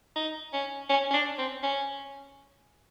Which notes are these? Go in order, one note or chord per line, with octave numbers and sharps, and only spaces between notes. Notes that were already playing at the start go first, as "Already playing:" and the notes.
D#4
C#4
C#4
C#4
D4
C4
C#4